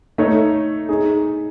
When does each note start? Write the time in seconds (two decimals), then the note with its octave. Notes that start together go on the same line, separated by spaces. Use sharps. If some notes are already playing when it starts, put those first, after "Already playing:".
0.18 A3 D#4 A4 C#5
0.89 D#4 G#4